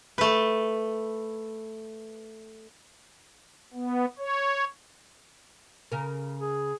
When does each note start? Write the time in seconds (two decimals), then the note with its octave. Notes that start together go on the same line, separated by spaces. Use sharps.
0.18 A3 B4
3.74 B3
4.18 C#5
5.92 C#3 A#4
6.39 G#4